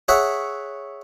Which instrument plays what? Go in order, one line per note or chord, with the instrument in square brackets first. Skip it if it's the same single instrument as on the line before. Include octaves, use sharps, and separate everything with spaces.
[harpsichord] G#4 C#5 E5 F#5